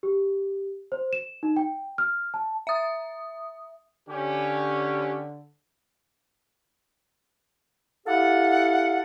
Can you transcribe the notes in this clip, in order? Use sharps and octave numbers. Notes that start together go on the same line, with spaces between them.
G4
C5
E7
D#4
G5
F6
A5
E5 D#6
D3 C#4 G4
E4 G4 A4 F5 F#5